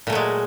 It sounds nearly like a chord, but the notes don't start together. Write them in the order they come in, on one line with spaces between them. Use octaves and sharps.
A#2 A3 F#3 G#3